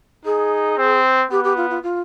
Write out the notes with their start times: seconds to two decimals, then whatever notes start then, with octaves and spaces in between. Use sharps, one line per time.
0.25 D#4 G#4
0.78 C4
1.31 B3 G4
1.44 G4
1.57 F4
1.70 F4
1.83 F4